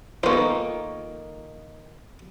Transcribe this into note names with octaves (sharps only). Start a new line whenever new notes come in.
D#3 A#3 B3 F4 A4 C5 C#6